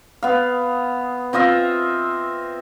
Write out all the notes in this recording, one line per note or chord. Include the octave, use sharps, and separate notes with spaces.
B3 F5
C4 F4 D#5 E5